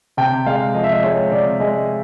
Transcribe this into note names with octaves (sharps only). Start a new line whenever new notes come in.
C3 G5
G#3 F5
F3 D#5
E5
D#5
G#3 C#5
C3 D5
G#3 D#5